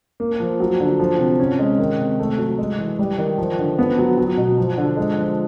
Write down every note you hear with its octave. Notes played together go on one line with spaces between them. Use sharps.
A#3
F3
F#3
D3
F3
C3
C#4
G#3
D#3
C3
A3
F#3
G#3
E3
G3
D#3
F3
D3
B3
F#3
F#3
B2
F3
D3
G#3
F3